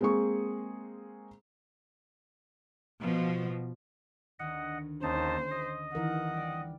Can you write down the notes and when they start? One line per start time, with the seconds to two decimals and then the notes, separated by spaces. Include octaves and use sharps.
0.01 G#3 A#3 C4 G#4 C#6
3.02 B2 F3
4.39 D2 D3 D#3 D#5 F#5
5.03 D#2 C#4 D#4 C5 A5
5.51 D#5
5.95 D#3 E3 A#4 F#5
6.34 G3 D5